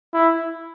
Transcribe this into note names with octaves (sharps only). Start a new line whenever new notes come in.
E4